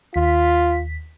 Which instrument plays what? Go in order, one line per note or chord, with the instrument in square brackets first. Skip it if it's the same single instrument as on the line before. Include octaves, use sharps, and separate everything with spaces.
[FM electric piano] D#2 B6 [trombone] F4